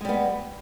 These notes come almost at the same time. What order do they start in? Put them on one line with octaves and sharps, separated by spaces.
G#3 G3 B3